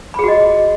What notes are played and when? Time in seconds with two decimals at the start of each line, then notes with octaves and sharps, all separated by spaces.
0.14 B5
0.19 G#4
0.24 F#4
0.28 D#5